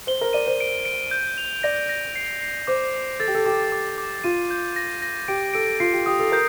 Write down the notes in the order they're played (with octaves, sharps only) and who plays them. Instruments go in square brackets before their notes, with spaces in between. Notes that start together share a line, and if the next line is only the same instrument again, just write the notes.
[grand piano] C5 [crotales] G7
[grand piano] A#4
[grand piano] D5 [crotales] D#7
[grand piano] C5
[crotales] D7
D7
G6
F7
[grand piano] D5 [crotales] A#6
[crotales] A#6
C7
C7
[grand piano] C5 [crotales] D6
[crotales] D6
[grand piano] A4 [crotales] A6
[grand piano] G4
A4
[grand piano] G4 [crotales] D6
[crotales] D6
D6
[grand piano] F4 [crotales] D#7
[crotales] G6
A#6
A#6
[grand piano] G4 [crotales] D7
[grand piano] A4 [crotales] D7
[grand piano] F4 [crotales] C7
[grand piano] G4
[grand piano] G4 [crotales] D#6
[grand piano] A4
[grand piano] A#4 [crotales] G6